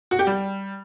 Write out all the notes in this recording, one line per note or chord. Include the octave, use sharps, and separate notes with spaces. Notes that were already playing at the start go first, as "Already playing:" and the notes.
F#4
G4
G3